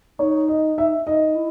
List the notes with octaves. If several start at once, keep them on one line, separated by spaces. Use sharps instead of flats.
D#4 C#5
D#5
E5
D#4 D#5
E4